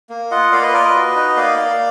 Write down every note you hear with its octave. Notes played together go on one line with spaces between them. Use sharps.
A#3
F4 D#5 F#5
A#3 D5 F5
B4 D#5
F4 A#4 D5
B4 D#5
F#4
D#4
A#3 D5 F5
A#3